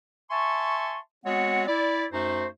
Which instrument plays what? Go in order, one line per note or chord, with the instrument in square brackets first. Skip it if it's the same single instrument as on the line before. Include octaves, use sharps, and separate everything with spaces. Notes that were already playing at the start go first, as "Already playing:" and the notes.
[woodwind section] E5 G#5 A5 C6 C#6
G#3 B3 C4 F#4 C#5 F#5
E4 D5
F#2 A3 D#4 F#4 C5